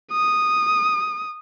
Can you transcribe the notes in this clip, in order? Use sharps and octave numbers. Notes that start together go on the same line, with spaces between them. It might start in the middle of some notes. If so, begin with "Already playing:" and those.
D#6